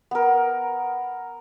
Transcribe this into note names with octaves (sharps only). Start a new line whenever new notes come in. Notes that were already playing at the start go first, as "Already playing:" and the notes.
B3 A#4